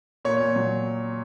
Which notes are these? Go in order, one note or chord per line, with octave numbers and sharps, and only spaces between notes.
A#2 C#5
A#2
F#3